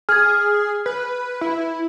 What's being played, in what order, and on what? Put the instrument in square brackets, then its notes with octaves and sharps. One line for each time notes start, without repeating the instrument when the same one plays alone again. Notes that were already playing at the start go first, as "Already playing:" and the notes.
[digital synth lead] G#4 [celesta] F6 G#6
[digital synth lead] B4
E4